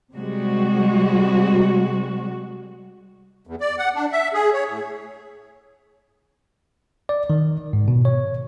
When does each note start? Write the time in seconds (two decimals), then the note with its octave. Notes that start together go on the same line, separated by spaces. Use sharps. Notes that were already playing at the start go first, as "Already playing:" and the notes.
0.15 C3 G3 G#3 F#4
3.47 E2
3.61 D5
3.78 F#5
3.95 D4
4.12 E5
4.34 G#4
4.53 C#5
4.69 A2
7.09 D5
7.30 D#3
7.73 G#2
7.88 B2
8.05 C#5